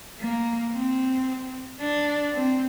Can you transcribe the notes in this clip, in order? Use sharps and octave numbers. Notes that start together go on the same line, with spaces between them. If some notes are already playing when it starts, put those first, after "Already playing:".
A#3
C4
D4
C4